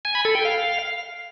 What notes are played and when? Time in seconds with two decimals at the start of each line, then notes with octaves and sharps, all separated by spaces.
0.05 G#5
0.15 B5
0.25 A4
0.35 G5
0.45 F5